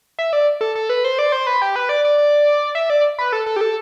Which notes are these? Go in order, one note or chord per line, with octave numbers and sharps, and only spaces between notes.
E5
D5
A4
A4
B4
C5
D5
C5
B4
G4
B4
D5
D5
D5
E5
D5
B4
A4
A4
G4
A4